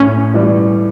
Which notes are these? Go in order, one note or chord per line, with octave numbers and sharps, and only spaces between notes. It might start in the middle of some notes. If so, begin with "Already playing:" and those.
Already playing: A2 C#4
E3 G3